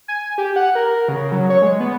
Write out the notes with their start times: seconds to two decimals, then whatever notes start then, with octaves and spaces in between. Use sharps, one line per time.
0.08 G#5
0.38 G4
0.56 F#5
0.75 A#4
1.08 C#3
1.32 F#3
1.50 C#5
1.62 G#3
1.80 B3